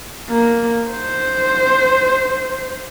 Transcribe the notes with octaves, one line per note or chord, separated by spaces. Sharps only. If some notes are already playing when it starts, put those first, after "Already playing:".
A#3
C5